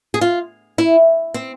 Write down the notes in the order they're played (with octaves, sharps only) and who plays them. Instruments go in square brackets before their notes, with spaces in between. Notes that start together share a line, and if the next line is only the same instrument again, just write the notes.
[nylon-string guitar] G#4
F4
E4
C4